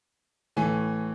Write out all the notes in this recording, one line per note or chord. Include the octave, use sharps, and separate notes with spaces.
A2 E3 A3 G#5